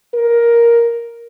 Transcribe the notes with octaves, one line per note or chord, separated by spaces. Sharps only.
A#4